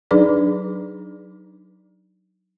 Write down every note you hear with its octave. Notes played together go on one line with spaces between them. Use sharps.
F#3 D4 D#4 G#4 B4 D5